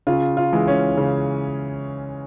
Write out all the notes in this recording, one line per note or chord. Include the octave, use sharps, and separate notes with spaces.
C#3 F4
F4
E3 G#3
C#4
C#3